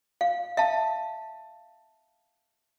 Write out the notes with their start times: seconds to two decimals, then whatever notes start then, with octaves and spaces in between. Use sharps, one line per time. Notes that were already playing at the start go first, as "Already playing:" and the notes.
0.21 F5
0.57 E5 F5 A5